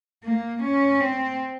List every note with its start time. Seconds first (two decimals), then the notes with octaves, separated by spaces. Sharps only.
0.24 A#3
0.63 C#4
1.01 C4